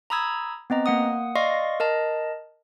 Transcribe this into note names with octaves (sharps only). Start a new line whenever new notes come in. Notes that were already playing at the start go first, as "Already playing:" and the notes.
A#5 B5 D#6 E6 G#6
B3 C4 D#5 A#5
A#3 F#5 D#6
D5 D#5 F5 C6 C#6 A#6
A#4 D#5 A5